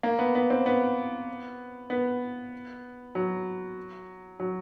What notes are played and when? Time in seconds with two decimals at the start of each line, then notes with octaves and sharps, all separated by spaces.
0.03 A#3
0.19 B3
0.35 B3
0.50 C4
0.66 B3
1.90 B3
3.15 F#3
4.40 F#3